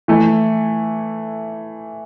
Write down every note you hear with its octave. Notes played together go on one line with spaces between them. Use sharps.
E3 A3 E4